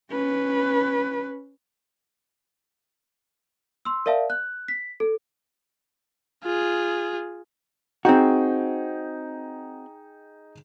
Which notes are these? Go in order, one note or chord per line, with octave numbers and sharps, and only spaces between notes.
C#4 B4
C6 E6
A#4 D5 E5 F5 A5
F#6
B6
A4
F4 G#4
C4 D#4 F#4 G#4 G5